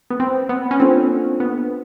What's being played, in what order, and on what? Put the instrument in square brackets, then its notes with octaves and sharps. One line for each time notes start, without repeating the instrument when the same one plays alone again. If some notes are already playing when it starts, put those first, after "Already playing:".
[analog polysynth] B3
C4
B3
C#4
[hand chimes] A#3 D4 F4 A4 C5 [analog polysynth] C4
[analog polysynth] B3